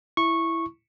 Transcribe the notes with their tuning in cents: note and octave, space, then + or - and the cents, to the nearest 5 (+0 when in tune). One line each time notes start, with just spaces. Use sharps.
E4 +5 C#6 -10